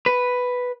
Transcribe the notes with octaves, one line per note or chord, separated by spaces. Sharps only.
B4